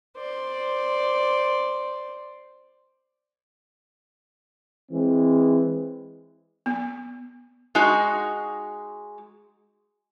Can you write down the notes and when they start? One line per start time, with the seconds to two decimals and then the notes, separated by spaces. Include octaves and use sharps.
0.18 C5 D5
4.92 E3 G#3 C4
6.66 B3
7.75 G#3 D#4 F#4